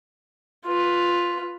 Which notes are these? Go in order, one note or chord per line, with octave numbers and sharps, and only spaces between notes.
F4 B4